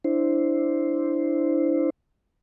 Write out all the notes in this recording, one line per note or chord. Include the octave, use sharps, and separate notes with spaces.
D4 E4 C5